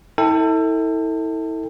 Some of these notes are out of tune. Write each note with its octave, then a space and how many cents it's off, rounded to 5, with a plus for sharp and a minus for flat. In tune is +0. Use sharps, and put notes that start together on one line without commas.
E4 -35 A4 +25 G5 +25